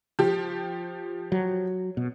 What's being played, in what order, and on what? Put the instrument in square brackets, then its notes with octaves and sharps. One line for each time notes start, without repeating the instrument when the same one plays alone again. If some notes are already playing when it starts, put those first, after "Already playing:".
[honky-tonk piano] F3 G4
[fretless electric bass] F#3
B2